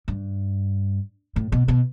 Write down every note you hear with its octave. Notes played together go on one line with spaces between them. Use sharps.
G2
A2
B2
B2